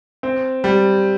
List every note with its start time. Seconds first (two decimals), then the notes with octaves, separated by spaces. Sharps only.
0.23 C4
0.64 G3